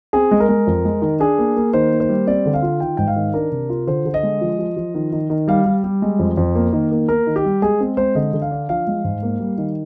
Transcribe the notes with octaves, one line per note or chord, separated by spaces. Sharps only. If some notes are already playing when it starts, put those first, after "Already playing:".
C4 G#4
G#3
A#4
G#3
F2
G#3
D#3
D4 G#4
A#3
A#3
D#3 C5
A#3
C5
G3
C4 D5
D3
F5
F4
D#3 G5
G#2 G5
F5
D#3
D4 A#4
C3
F4
D3 C5
D3
D#5
G#3
F3
F3
F3
D#3
D#3
D#3
G3 F5
G3
G3
G#3
F2
F2
A#3
D#3
A#3
A#3 A#4
D#3
G4
G3
G#3 G#4
C4
G#3 C5
D3 D#5
D3
F5
D4
F3 F5
G#3
G#2
A#3
G3
D#3